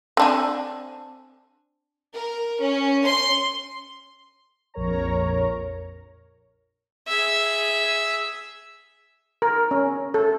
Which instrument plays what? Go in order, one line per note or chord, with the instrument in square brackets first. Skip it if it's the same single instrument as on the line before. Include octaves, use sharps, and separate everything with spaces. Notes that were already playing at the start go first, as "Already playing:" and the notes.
[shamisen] C4 D4 G#5
[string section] A#4
C#4
C6
[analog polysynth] A#1 F2 A#4 C#5 A#5
[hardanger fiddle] G#4 E5
[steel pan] A#4
C#4
A4